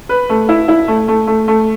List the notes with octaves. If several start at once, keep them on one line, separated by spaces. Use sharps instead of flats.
B4
A3
E4
E4
A3
A3
A3
A3